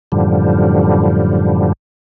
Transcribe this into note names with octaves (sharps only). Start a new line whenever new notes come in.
F#2 A2 D3 F3 G3